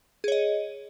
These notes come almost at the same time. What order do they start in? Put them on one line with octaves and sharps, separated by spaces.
G#4 C#5 D#5